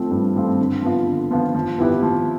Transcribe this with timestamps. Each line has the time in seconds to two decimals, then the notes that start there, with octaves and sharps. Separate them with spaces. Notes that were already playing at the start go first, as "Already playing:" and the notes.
Already playing: F3 A3 C4 F4
0.11 G2
0.35 F3 A3 C4 F4
0.59 D3
0.82 F3 B3 F4
1.07 D3
1.31 F3 B3 F4
1.55 F3
1.78 B3 E4 G4 B4
2.02 F3